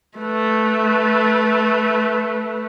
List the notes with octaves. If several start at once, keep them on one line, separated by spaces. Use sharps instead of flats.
A3 B4